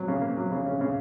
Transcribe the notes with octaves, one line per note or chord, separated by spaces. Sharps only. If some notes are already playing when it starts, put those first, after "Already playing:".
Already playing: F#3
C#3
A#3
F#3
C#3
C#3
C#3